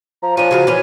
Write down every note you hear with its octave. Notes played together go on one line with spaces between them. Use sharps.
F3 A#5
F3 C#4 D4 D#7
C#3 F#3 A#4
E3 C#4 A#4